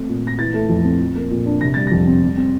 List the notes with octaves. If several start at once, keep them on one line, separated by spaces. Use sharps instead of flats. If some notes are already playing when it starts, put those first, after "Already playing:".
Already playing: A3 C4
A#2
A#2 A#6
E3 A6
A3
F2
C4
F3
A#3
A#2
D4
C3 A#6
G3 A6
F2 A#6
C4
G3
C4